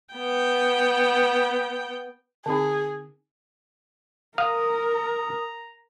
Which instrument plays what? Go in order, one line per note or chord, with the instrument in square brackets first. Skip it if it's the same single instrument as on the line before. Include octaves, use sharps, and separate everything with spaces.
[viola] B3 G5
[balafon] D3 C4 D#4 [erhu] G#4
[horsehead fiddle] A#4 [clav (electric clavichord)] F5 [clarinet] A#5 [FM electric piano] D#6